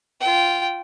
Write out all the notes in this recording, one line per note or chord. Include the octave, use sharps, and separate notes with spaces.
F4 G5